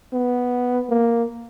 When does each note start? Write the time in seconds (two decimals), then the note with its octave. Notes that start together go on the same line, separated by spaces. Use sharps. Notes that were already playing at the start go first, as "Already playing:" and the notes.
0.13 B3
0.89 A#3